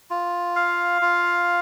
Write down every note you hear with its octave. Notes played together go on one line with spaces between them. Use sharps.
F4
F5
F4